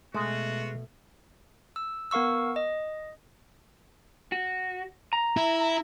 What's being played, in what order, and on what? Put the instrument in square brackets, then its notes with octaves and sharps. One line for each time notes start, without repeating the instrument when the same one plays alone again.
[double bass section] B2 [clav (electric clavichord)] G#3 [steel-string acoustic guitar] A3 [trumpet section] F4 F#4
[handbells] E6
B3 A#4 F5 C#6 E6
D#5
[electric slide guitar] F#4
A#5
[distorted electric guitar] E4